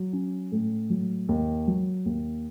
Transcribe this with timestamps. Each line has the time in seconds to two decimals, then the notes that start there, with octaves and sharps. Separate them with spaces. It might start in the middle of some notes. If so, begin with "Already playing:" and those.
Already playing: F#3
0.13 C#4
0.52 A2
0.90 F#3
1.29 D#2
1.67 F#3
2.06 D#2